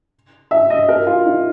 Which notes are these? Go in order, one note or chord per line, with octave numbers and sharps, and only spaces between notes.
E5
D#5
A#4
F4
D#4